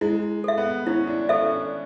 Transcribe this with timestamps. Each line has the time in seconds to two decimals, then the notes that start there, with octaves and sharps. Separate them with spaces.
0.01 G#3 E4
0.44 A4 E5
0.58 B3
0.87 C#4 E4
1.07 D4
1.29 C#4 A4 E5
1.50 D4